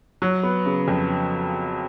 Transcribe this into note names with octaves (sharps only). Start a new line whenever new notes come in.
F#3
B3
C#3
F2